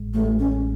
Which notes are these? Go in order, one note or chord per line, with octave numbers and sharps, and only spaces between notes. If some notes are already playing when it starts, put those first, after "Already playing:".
Already playing: A1 A2 G#3
A1 A2 G#3 A3
C#4